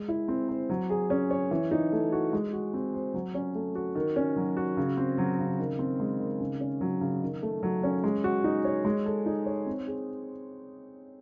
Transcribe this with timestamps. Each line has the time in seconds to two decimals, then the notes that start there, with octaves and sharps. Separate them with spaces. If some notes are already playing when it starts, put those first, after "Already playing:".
Already playing: G#3
0.08 E4
0.28 C4
0.49 C5
0.69 F#3
0.90 G#4
1.10 C#4
1.31 C#5
1.51 E3
1.71 D#4
1.92 A3
2.12 F#4
2.33 G#3
2.53 F#4
2.74 C4
2.94 C5
3.14 F#3
3.34 C#4
3.55 A3
3.75 F#4
3.95 D#3
4.16 C#4
4.36 F#3
4.57 F#4
4.77 C#3
4.97 C4
5.18 F#3
5.39 C#3
5.59 D#3
5.79 C4
6.00 G#3
6.20 D#3
6.40 C#3
6.60 C#4
6.81 F#3
7.01 C#3
7.22 D#3
7.42 A3
7.63 F#3
7.83 C#4
8.04 G#3
8.24 F#4
8.44 D#4
8.65 C#5
8.85 G#3
9.06 A4
9.26 D#4
9.46 C#5
9.66 C4
9.87 G#4